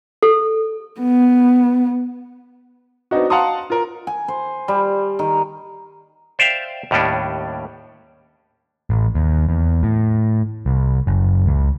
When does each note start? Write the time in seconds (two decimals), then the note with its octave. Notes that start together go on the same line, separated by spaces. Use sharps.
0.23 A4
1.01 B3
3.11 B3 C4 D4 D#4 F#4
3.30 F5 F#5 A5 A#5 C6 D#6
3.70 F4 A#4
4.07 G#5
4.28 C5
4.68 G3
5.19 D#3
6.39 C5 D5 E5 F5 G5
6.91 D#2 A2 G3 C#4 D4
8.90 A1
9.15 D#2
9.49 E2
9.83 A2
10.66 C2
11.07 F#1
11.46 C#2